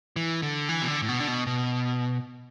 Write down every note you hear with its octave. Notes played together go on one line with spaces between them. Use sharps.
E3
D3
E3
B2
D3
A2
B2
D3
B2
B2